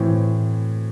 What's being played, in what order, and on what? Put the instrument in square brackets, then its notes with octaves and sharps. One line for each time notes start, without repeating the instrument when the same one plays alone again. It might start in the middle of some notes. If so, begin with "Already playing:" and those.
Already playing: [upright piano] A2 E3 C4